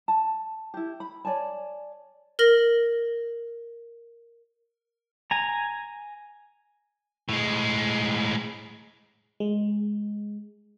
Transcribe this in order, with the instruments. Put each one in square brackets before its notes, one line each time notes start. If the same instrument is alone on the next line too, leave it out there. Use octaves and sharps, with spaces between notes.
[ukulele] A5
E4 G4
B5
C#5 D5 G#5 A5
[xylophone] A#4 F6 A#6 F#7
[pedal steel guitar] G#5 A#5
[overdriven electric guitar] A2 G#3
[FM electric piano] G#3